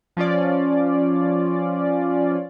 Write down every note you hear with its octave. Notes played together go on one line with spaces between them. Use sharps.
F3 C#4 F4 D5